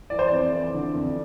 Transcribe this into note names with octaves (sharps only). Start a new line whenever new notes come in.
E3 D5
C5
F2 D5
E3
D3
F2